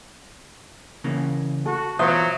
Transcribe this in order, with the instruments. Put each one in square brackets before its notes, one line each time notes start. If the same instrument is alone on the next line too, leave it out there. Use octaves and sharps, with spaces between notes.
[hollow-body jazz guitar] C#3 E3 A#3
[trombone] F#4 [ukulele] A4
[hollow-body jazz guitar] B2 E3 F4 [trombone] F#3 [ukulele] B4 C5 E5 [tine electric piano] D#6